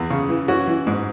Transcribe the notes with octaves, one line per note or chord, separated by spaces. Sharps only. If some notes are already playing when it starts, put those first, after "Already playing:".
Already playing: E2
C#3
E3
E3 C#4 F#4
E3
G#2